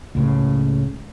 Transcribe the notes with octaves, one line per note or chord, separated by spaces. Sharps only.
C#2 A2 C#3